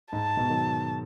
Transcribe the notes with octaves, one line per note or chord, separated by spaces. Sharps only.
G#2 A5
G#2 B2
D#3 F#3